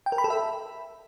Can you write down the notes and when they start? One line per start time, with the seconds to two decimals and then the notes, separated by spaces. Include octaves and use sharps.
0.06 G5
0.12 A#4
0.18 B5
0.24 A4
0.30 E5